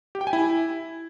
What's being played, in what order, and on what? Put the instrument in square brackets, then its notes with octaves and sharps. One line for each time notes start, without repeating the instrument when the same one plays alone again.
[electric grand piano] G4
G5
G#5
E4